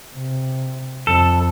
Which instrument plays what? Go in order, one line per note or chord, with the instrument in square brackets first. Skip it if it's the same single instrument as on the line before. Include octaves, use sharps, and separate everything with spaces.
[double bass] C3
[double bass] F2 [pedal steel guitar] A4